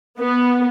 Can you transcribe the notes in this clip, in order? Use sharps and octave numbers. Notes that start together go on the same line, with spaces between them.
B3